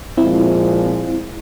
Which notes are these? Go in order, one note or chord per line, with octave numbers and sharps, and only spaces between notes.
A#2 F3 G#3 C4 E4